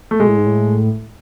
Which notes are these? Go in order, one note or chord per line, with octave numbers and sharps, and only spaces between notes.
A3
B2 G#3
A2
G#2
A2